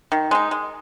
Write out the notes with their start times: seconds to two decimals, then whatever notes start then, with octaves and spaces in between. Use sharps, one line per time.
0.12 D#3
0.31 G#3 D#4
0.51 G#3